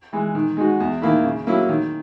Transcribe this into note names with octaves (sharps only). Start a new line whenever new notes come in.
E3 G#3
D#3
G#3 D#4 F#4
E2
D#3 A#3 E4
C#3
F#3 A#3 C#4 E4
D#3